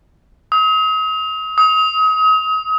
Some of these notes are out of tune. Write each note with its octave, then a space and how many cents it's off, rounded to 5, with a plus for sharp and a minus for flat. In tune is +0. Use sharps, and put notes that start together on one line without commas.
D#6 +40
D#6 +35